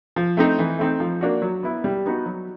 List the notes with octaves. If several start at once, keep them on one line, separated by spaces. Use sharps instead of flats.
F3
A3 C4 D#4
E3
A3 C4 D#4
F3
A#3 D4 F#4
F#3
B3 E4
G3
B3 D#4 F#4
F#3